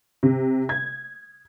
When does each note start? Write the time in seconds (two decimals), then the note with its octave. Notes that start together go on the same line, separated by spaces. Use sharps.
0.23 C3
0.69 G#6